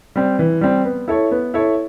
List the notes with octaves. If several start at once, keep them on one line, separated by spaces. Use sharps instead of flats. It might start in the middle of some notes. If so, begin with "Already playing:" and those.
G3 C4
E3
G3 C4
B3
E4 A4 C#5
B3
E4 A4 C#5